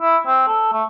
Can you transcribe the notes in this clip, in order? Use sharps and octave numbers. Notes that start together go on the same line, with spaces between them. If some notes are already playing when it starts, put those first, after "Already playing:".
E4
C4
A4
A3